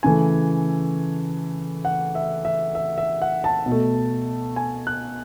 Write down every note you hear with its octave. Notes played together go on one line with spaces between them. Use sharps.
C#3 E3 A3 G#5
F#5
E5
E5
E5
E5
F#5
A5
B2
A3
G#5
F#6